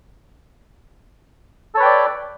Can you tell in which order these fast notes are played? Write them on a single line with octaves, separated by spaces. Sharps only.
A4 C#5 B4 G5 D5